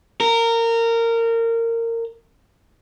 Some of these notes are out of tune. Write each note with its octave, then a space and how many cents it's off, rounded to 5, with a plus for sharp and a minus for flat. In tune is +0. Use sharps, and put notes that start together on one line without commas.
A#4 -20